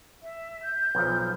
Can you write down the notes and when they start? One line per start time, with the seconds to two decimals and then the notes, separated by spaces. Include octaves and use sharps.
0.23 E5
0.62 G6
0.95 B1 F3